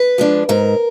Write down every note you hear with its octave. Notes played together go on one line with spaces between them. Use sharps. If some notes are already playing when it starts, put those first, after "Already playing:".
Already playing: B4
F3 G#3 D4
G#2 A#4